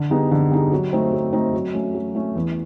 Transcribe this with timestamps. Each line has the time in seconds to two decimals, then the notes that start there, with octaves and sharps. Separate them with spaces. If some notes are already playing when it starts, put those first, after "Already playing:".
Already playing: D3
0.10 G3 B3 D#4 G#4
0.31 D3
0.51 G3 B3 D#4 G#4
0.72 F#3
0.93 A3 C4 D#4
1.13 F#3
1.33 A3 C4 D#4
1.53 F#3
1.74 A3 C#4
1.95 F#3
2.15 A3 C#4
2.35 E2